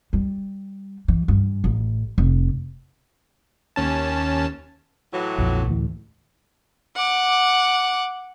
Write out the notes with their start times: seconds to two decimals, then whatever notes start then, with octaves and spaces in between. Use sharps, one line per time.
0.13 G3
1.08 E3
1.28 G2
1.64 A1
2.18 F1
3.76 D#2 C#4 A5
5.13 A2 E3 F#3
5.38 A#1 F2
5.68 D2 A2 E3
6.96 F#5 D6